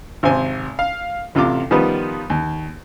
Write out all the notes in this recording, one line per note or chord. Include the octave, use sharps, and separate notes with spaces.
G#1 C3 C5 G#5
F5
A1 C3 F4 D6
D#3 F3 G3 B3
D#2